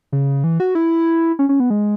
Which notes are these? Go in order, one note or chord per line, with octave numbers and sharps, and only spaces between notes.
C#3
E3
F#4
E4
C#4
C#4
B3
G#3